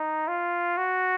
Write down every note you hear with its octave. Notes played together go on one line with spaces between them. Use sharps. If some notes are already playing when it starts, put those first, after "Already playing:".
Already playing: D#4
F4
F#4